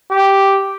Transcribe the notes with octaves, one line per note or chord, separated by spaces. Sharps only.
G4